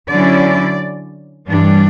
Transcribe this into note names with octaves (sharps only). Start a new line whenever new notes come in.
D3 F#3 C#4 E4 D5
G2 E3 G3 D4